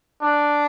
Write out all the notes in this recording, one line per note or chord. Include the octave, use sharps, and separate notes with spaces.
D4